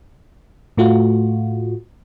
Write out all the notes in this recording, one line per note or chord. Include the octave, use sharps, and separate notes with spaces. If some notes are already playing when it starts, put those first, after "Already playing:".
A2 A3 F4 F#4